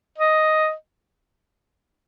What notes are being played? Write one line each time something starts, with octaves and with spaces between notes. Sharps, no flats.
D#5